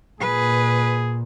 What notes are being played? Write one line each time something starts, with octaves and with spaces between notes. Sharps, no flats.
A#2 G#4 B4